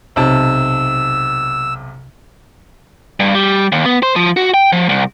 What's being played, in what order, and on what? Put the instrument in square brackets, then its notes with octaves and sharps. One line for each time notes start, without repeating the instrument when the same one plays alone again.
[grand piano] B1 C3 A5 [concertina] E6
[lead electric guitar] G2
G3
D#2
B3
C5
F3
F#4
G5
F3
C2